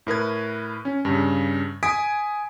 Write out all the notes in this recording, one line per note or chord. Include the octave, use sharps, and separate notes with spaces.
A2 A#4 B4 G#6
C#4
G2 C#3
G#5 D#6 G#6 B6 D7